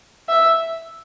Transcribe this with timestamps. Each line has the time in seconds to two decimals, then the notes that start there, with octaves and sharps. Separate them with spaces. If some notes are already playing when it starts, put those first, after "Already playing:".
0.29 E5